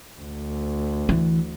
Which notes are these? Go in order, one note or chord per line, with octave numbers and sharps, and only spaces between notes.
D2
E3